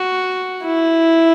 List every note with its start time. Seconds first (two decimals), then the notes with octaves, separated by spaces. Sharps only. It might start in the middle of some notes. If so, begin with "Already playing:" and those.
Already playing: F#4
0.65 E4